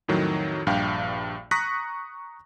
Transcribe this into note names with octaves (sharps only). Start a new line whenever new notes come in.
F2 A2 D#3 F#3
A#1 G2 F5 G5
A#5 C#6 D#6 F#6 A#6 B6